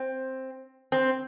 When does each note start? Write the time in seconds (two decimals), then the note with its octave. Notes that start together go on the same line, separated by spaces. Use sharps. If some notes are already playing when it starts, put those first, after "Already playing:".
Already playing: C4
0.92 C4